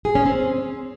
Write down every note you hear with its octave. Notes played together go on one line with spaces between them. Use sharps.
G#4
C#4
C4